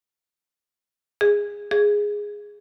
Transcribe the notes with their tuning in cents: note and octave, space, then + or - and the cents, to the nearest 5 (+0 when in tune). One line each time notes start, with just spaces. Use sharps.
G#4 -15
G#4 -5